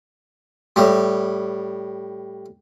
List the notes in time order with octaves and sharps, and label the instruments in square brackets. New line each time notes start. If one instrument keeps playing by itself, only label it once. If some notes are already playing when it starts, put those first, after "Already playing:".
[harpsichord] A2 G3